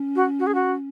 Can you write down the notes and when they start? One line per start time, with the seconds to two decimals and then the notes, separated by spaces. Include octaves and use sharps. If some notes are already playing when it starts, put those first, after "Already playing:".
Already playing: C#4
0.16 F#4
0.39 F#4
0.47 G#4
0.55 F#4